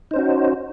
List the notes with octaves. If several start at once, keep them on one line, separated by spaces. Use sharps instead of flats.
C#4 D#4 F#4 C5